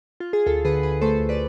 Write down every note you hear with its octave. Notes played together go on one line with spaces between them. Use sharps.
F4
G#4
D2 F4 A4
D3 G#4 B4
D2 G#4 B4
A3 A4 C5
D2
B4 D5